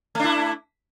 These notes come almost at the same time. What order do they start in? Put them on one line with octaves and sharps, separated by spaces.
A3 D4 E4